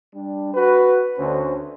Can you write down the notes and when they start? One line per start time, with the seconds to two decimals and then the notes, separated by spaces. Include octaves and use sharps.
0.15 G3 D4
0.55 F#4 B4
1.18 D2 D3 C#4 F#4 C5